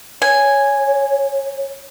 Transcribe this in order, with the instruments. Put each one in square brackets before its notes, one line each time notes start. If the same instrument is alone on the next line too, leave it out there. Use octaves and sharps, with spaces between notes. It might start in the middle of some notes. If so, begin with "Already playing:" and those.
[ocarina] C#5 [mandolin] G#5